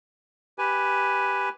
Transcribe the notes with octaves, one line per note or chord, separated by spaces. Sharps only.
G4 B4 G#5